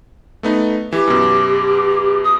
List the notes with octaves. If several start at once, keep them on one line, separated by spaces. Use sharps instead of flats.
A3 B3 D#4
E3 G4
F#2 B2
D#6